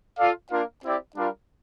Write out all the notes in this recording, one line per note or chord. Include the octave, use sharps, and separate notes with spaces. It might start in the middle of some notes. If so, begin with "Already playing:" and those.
F4 A4 D5 F5
A#3 D4 F4 A#4 F5
C4 E4 G4 D5
G3 D4 F4 A#4 F5